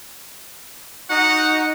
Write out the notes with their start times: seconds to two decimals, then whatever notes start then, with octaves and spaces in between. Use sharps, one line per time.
1.10 D#4 F#4 F#5